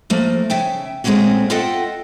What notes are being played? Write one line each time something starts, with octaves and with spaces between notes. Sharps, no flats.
F3 A3 A#3
C#3 E5 G5
A#2 G#3 A3 C4 C#4 F#4
F4 A4 D#5 E5 F#5 G5